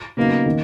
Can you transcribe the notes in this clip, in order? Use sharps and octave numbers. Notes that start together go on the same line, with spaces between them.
C#3 F#3 A#3 B3 D#4
D#3 A#3 D#4